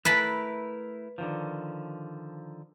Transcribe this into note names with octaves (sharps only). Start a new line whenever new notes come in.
A3 E4 A#4 B4 A5 B5
D3 D#3 F3